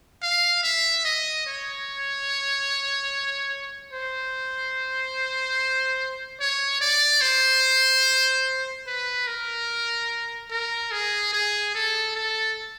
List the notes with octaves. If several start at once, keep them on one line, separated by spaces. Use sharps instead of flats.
F5
E5
D#5
C#5
C5
C#5
D5
C5
B4
A#4
A#4
G#4
G#4
A4
A4